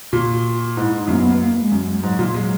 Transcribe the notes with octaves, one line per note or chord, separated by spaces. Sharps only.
A#2 F#4
G#2 E4
D#4
F#2 A#3
B3
A#3
G#3
F#2
G#3
G#2 F#3
A#2
F#3 G#3